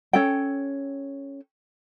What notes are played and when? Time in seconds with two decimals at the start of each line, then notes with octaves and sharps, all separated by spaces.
0.13 C#4 A4 G5